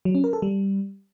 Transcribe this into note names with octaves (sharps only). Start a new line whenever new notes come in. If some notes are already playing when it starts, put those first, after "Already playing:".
F#3
C#4
A#4
A4
G3